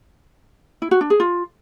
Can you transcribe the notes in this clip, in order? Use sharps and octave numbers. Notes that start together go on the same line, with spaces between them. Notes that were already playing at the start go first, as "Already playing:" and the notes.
E4
F#4
D4
G#4
F4